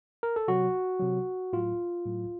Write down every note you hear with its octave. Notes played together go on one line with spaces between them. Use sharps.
A#4
A4
C3 F#3 F#4
C3 F#3
A2 F#3 F4
A2 F#3